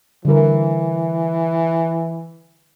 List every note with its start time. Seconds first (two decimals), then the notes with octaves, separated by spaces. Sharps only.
0.25 D3 E3 G3 A#4